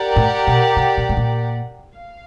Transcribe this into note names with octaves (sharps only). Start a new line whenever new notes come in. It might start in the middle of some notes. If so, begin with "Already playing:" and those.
Already playing: G4 A#4 D5 F#5
A2
B2
C3
A#2
A2
A#2
F5